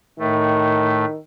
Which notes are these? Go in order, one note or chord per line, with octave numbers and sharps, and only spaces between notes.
A2 D#3 A3